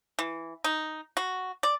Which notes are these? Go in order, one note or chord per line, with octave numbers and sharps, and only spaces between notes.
E3
D#4
F#4
D5